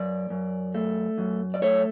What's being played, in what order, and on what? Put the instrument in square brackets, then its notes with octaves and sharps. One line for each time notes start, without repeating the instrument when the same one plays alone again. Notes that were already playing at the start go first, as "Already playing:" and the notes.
Already playing: [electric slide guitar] F#2 D5
F#2
A3
F#2
D5
A3 C#5